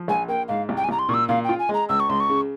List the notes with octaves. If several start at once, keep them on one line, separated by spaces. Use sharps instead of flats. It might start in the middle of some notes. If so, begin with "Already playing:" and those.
Already playing: F3
A#1 G#5
A#3 G5
G#2 F5
C2
G5
G#5
C2 A#5
C6
A#2 C#6
E6
A#2 F5
F4 G5
G#5
G#3 A#5
C#2 E6
C#6
C#2 C6
C#6
C#3